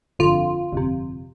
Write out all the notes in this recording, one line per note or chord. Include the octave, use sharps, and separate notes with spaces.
G1 F2 D3 F4
G1 F2 C3